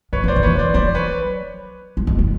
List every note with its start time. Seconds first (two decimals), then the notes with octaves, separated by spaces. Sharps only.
0.13 F3 B4 C#5
0.24 E3 C5 D5
0.36 D#3
0.43 E3 B4 C#5
0.59 C5 D5
0.74 F#3 C5 D5
0.95 B4 C#5
1.97 G3
2.07 G#3
2.19 G3